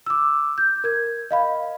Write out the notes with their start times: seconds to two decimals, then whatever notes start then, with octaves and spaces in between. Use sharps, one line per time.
0.06 D6 E6
0.58 G6
0.84 A#4 G#6
1.31 D#5 F5 B5